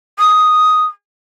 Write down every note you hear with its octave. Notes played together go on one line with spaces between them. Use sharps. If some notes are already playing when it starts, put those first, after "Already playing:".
D#6